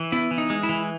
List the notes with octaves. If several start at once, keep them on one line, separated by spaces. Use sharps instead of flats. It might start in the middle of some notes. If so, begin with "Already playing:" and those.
Already playing: E3
B3 E4
E3
D#4
G#3
E4
E3